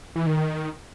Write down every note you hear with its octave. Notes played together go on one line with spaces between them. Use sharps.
E3
D#3
D#3